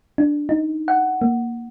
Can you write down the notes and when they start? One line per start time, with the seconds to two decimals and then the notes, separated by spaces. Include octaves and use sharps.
0.18 D4
0.49 D#4
0.88 F#5
1.22 A#3